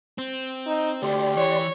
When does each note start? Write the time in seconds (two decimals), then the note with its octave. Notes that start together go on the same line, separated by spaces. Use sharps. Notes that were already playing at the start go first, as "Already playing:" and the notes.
0.18 C4
0.66 D#4
1.02 D2 A3 G4 D5 C6
1.37 E3 C#5